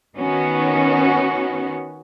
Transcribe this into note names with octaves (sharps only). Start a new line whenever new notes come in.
D#3 B3 C#4 F#4